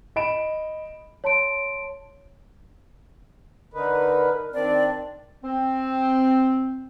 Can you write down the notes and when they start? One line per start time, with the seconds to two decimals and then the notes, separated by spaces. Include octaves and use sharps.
0.16 D#5 B5 D7 E7
1.24 C#5 A5 C6 D7
3.74 D3 D#4 A#4 B4
4.54 D#3 C4 D4 D5
5.44 C4